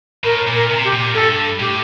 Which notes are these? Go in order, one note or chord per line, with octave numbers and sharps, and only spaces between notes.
A2 A#4
A#2
A#4
C3
G4
A#2
G2 A4
A2 G4